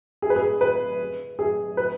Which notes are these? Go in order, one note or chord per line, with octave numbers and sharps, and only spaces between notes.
G#4
B4
G#4
B4
G#4
B4